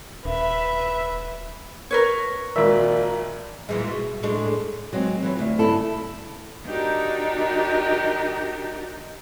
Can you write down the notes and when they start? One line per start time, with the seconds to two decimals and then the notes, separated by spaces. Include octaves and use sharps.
0.25 D#1 B4 E5
1.91 A#4 B4 C#5
2.56 G#1 A#2 E5
3.69 A#2 E3 G#3
3.87 B2
4.23 A2 G#3 D4
4.93 F#3 G#3 C4
5.23 E3 F#3
5.39 D2
5.59 G2 C#3 E4 A4
6.65 D4 D#4 F#4 G4 A#4